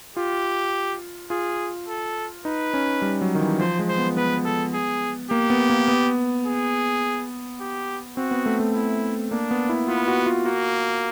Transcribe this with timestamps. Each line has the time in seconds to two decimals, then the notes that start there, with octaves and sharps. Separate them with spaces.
0.17 F4 G4
1.30 F4 G#4
1.88 A4
2.45 D#4 B4
2.74 C#4
3.02 G3
3.22 F#3
3.35 D#3
3.40 E3
3.59 F3 C5
3.79 G#3
3.88 C5
3.98 B3
4.17 B3 B4
4.45 A4
4.74 G#4
5.31 A#3 G4
5.50 B3
5.70 A#3
5.88 B3
6.46 G#4
7.60 G4
8.17 C4 F#4
8.31 B3
8.46 A3
8.60 A3
8.74 E4
9.31 A#3 D4
9.51 B3
9.69 E4
9.88 B3 F4
10.08 F#4
10.26 F4
10.45 A#3 F#4